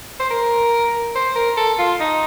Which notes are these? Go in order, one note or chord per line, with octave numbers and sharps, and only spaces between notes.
C5
A#4
C5
A#4
A4
F4
D#4